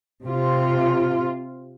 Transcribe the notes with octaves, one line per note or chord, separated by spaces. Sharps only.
C3 F4